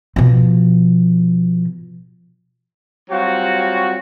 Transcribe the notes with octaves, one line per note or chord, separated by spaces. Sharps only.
B2 F3
F#3 G3 C4 F4 F#4